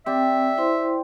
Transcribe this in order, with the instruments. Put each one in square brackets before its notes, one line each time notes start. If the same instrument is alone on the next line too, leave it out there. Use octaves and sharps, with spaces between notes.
[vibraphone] C4 [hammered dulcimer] G4 D5 [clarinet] E5
[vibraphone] E4 C5 C6